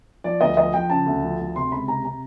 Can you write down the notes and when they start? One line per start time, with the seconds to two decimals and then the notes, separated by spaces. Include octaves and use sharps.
0.24 F3 D5
0.41 D2 D#5
0.57 F3 D#5
0.74 F3 G5
0.90 C#3 A5
1.06 D2
1.23 F3
1.39 D2
1.55 C3 C6
1.72 C#2 B5
1.88 C3 A#5
2.04 C3 A#5